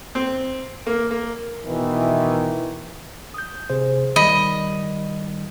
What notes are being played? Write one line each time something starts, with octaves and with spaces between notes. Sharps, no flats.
C4
A#3
A#3
B2 D#3 E3
D#6 G6
C3 G#4 C5
D#3 G3 D#5 B5